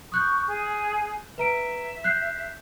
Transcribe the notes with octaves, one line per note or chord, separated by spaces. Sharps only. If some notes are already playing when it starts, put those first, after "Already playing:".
C#6 D#6 F#6 G6
G#4
B4 E5 A#5 D7
F#6 G6 C7